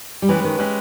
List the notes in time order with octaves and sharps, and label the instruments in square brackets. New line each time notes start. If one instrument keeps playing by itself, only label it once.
[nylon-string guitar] G3
[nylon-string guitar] E3 [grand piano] G#3 C#4 G4 B4
[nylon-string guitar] D#3
[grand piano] G#3 C#4 G4 B4